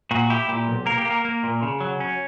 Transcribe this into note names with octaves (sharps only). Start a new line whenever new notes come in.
A#2 F#4
E4 G4
A#2 G4
B1
A#3 A#4
G4
A#3
A#4
A#3
A#2
C#3
F#3
C#4